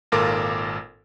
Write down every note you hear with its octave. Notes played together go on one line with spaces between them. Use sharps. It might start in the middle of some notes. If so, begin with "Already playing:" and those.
G#1 A#2 F4 A4 A#4 D6